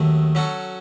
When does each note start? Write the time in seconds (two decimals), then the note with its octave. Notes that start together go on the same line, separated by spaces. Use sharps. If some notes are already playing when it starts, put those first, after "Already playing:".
Already playing: D#2 D#3 F#3 A3
0.35 F#3 C#4 F#4 A4